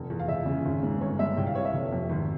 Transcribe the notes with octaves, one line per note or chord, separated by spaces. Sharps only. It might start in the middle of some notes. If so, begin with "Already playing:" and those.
Already playing: F1
E2
F5
C#2 E5
C#3
G#1
G#2
G1 C#5
G2 E5
C2 G5
F5
C3 C#5
E5
F1
F2
G#1